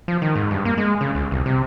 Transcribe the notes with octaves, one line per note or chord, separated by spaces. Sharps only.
F3
D#3
G#2
G2
A#3
G#3
C#3
C#2
C2
C3